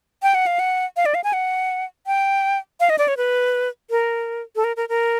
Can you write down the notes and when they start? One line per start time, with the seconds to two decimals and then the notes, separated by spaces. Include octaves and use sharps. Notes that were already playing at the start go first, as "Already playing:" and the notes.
0.23 G5
0.35 F#5
0.47 F5
0.59 F#5
0.96 F5
1.06 D5
1.15 F5
1.24 G#5
1.33 F#5
2.07 G5
2.80 F5
2.90 D#5
2.98 D5
3.08 C#5
3.17 B4
3.90 A#4
4.56 A4
4.64 A#4
4.76 A#4
4.89 A#4